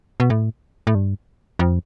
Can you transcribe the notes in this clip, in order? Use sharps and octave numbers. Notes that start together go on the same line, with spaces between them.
B2
A2
A2
G2
F2